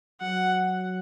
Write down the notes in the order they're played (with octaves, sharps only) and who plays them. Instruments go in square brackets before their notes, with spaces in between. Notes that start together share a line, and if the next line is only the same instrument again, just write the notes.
[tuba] F#3 [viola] F#5